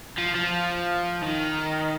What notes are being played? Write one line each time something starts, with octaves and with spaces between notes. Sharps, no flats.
F3
F3
D#3